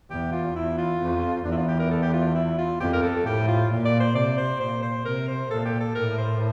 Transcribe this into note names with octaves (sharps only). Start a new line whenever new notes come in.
E2 G4
F4
E2 E4
F4
F2
E2 D4
E4
F4
G4
A#4
A4
G4
F4
E4
F4
F2 G4
A#4
A4
A2 G4
F4
A#2
D5
C5
C3 D5
C5
A#2 C5
C5
C3 A#4
C5
A#2 A4
G4
A4
A2 A#4
C5